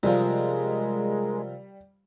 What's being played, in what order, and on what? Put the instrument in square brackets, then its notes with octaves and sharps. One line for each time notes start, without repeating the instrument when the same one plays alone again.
[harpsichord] C3 F3 [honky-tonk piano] G3 [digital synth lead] G#3 [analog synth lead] A#4